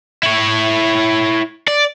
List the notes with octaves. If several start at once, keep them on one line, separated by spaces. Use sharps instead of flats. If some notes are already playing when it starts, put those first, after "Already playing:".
E4 C#5
D5